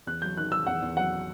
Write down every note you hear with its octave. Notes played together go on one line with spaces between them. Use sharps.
E2 F#6
F#3 G6
D#3 F#6
D#3 E6
E2 F#5
E2
F#3 F#5